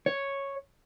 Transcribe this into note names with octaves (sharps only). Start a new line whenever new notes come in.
C#5